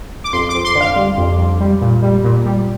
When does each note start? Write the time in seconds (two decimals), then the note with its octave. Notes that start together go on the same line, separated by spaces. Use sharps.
0.24 D6
0.33 F2 C6
0.49 F2 D6
0.65 C6
0.75 D3
0.81 F5
0.96 G3
1.18 F2
1.39 F2
1.60 G3
1.81 A#2
2.02 G3
2.24 A#2
2.46 G3